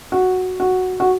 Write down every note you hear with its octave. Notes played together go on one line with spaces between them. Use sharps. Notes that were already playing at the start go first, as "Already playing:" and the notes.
F#4
F#4
F#4